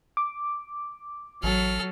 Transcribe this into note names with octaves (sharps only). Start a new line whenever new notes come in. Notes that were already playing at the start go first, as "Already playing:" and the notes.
D6
A1 F#3 A4 F6